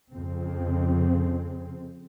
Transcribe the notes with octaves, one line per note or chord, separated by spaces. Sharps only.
F2 C#3 C4